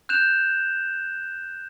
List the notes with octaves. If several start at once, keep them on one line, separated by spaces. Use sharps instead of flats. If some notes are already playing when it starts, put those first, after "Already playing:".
F#6 G6 E7 F7